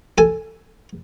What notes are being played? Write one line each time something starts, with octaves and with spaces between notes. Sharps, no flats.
A4 G#5